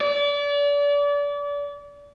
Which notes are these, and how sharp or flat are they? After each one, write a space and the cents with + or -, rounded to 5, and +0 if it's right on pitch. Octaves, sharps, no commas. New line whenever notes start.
D5 -35